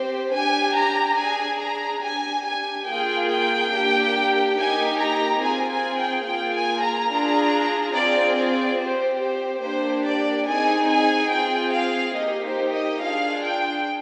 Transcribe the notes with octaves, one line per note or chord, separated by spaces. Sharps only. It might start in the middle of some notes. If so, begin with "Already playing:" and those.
Already playing: C4 G4 C5
D4 G4 G#5
A#5
D4 G#4 G#5
A#5
D4 G4 G#5
G#5
A#3 F4 G#4 G5
G5
A#3 D4 G4
A#3 D#4 G4 G#5
A#5
C4 F4 G#4 G#5
G#5
G5
A#3 F4 G#4 G5
G#5
A#5
D4 F4 G#4
C4 F4 G#4 D5
D5
C4 G4 C5
C5
A#3 D4 G4 C5
D5
C4 D#4 G#4 G#5
G#5
C4 F4 G#4 G5
F5
A#3 D#4 G4 D#5
C5
D#5
D4 F4 G#4 F5
G5